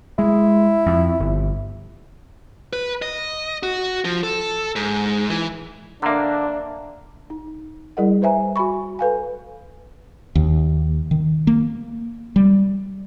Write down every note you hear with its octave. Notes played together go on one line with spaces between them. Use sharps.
G#3 E4
F2
G1
B4
D#5
F#4
F3
A4
G#2
E3
D3 A#3 D4 E5 A#5
D#4
G3 E4 G#4 A#4 D#5 F#5
B4 C5 E5 G#5 A#5
F#4 G#5 B5 C#6
A4 B4 F5 G#5
D#2
D#3
A#3
G3